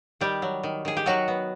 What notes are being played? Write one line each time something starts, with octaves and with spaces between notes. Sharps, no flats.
D#3 G3 G4
F#3
D#3
D#3 G#4
G4
D#3 F#3 F#4
B3